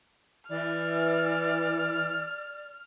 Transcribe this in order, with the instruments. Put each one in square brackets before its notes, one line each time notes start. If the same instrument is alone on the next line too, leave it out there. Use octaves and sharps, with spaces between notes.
[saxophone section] E3 [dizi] D5 [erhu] F6